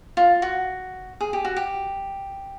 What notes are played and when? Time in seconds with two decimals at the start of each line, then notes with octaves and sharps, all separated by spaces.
0.17 F4
0.42 F#4
1.21 G#4
1.33 G4
1.45 F#4
1.56 G4